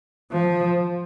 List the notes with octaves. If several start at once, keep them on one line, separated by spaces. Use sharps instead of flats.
F3